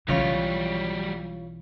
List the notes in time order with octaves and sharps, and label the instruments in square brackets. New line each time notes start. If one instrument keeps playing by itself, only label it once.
[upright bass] B1 E3 [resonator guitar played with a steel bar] C#3 F4 C#5 [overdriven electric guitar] F#3 G3